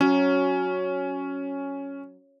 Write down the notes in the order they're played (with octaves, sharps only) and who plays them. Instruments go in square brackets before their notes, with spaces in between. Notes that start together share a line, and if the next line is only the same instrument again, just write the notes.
[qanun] F#3 [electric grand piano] C#4